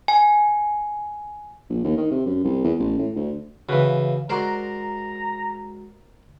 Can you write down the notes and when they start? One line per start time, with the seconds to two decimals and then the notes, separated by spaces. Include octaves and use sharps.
0.08 G#5
1.70 A#1
1.84 D#2
1.98 D#3
2.11 C3
2.26 F#2
2.44 C2
2.64 E2
2.79 A1
2.99 A2
3.16 D2
3.69 C#3 E3 F#4 B4 F5
4.30 G#3 F#4 A#4 C5 D5 A#5